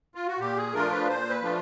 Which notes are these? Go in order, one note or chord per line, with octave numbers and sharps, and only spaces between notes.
F4
F#4
A#2 G4
G#4
F3 A3 D4 F4 A#4
B4
A#2 C5
B4
F3 A3 D4 F4